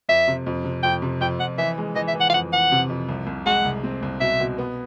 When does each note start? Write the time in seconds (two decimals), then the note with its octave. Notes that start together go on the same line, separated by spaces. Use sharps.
0.09 F2 E5
0.27 C3
0.46 F2
0.64 C3
0.83 F2 G5
1.02 C3
1.21 F2 G5
1.40 F2 F#5
1.58 E3 E5
1.78 G#3
1.96 E3 D#5
2.08 E5
2.14 E3
2.20 F#5
2.30 F5
2.34 F2 F#5
2.53 E3 F#5
2.72 C3
2.90 F2
3.09 C2
3.27 C2
3.46 G#3 F#5
3.65 C2
3.83 C4
4.03 C2
4.21 B2 E5
4.40 B2
4.58 B3